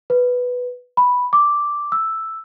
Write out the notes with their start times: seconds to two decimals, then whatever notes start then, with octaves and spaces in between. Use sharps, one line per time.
0.10 B4
0.97 B5
1.33 D6
1.92 E6